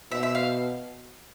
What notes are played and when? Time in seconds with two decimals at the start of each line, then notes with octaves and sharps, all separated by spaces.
0.11 B2 E5
0.23 E5
0.35 F5